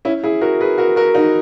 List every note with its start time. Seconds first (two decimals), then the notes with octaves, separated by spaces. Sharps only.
0.05 C#4 E4
0.23 E4 G#4
0.41 F#4 A#4
0.60 G#4 B4
0.78 F#4 A#4
0.96 F#4 A#4
1.15 D#4 F#4